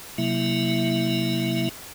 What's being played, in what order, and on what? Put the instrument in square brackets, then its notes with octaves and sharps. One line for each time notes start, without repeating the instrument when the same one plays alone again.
[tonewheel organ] C3 F#3 A#3 E4 E5